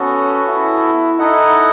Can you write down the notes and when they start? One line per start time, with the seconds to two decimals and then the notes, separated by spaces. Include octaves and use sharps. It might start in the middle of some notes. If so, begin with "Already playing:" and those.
Already playing: B3 C#4 F#4 A4
0.48 E4
1.19 D#4 E4 A4 D#5 F#5